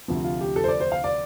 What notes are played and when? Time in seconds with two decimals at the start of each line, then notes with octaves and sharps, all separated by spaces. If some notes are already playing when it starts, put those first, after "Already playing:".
0.08 D2 C3 F3
0.24 F4
0.41 G4
0.56 A4
0.64 C5
0.68 D5
0.80 C5
0.92 F5
1.04 D5